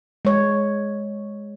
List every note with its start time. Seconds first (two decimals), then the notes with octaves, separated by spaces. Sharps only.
0.25 G#3 C#5